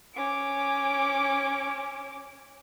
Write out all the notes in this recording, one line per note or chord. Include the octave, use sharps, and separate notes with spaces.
C#4 D6